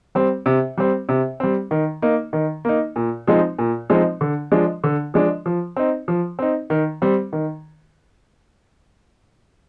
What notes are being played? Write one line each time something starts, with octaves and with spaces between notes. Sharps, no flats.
G3 C4
C3
G3 C4
C3
G3 C4
D#3
A#3 D#4
D#3
A#3 D#4
A#2
F3 G#3 C4 D#4
A#2
F3 G#3 C4 D#4
D3
F3 G#3 D4
D3
F3 G#3 D4
F3
C4 D#4
F3
C4 D#4
D#3
G3 C4
D#3